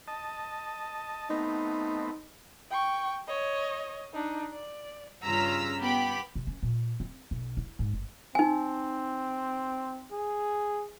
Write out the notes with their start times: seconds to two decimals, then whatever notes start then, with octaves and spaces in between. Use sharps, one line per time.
0.08 D#5 A5
1.30 A3 B3 C4 D#4
2.70 G5 C#6
3.27 C#5 D#5
4.13 D4 D#4
4.53 D5
5.24 G2 C#3 F4 A#5 E6 B6
5.79 B3 G4 B5
6.35 C3
6.47 C#4
6.63 A#2
7.00 C4
7.31 B1
7.57 E4
7.79 G#2
7.93 G1
8.35 C4 D#4 G#5
10.12 G#4